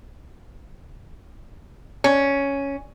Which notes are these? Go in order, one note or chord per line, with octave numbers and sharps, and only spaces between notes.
C#4